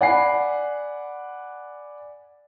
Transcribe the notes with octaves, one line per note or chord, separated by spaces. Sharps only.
D5 F#5 G#5 B5 C7